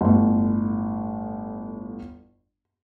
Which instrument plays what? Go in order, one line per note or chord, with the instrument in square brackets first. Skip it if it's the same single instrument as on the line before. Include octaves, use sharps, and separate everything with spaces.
[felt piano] G1 A2